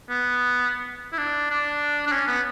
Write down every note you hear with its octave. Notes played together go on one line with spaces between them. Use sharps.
B3
E4
D4
D4
D4
C#4
B3